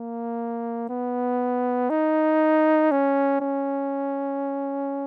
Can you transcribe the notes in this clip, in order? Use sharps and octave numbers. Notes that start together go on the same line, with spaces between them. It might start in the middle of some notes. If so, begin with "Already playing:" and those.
Already playing: A#3
B3
D#4
C#4
C#4